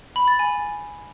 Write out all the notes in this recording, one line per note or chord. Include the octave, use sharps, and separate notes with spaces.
B5
A6
G#5